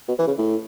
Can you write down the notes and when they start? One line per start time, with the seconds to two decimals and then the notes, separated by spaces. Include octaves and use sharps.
0.08 B2
0.19 E3
0.27 C#3
0.38 A2